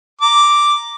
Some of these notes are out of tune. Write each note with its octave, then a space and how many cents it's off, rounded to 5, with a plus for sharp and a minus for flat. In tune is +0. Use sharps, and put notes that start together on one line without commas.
A#5 +0 D6 +0